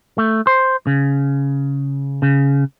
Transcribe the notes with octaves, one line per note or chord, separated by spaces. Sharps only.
A3
C5
C#3
C#3